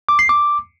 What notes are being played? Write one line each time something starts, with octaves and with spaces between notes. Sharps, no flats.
D6
C7
D6